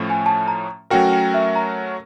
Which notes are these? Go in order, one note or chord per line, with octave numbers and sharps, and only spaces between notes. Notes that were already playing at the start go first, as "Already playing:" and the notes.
Already playing: A2 F3 A3 C#4
G#5
A5
A#5
F#3 A3 C#4 F#4 A#4 G5
G5
E5
A#5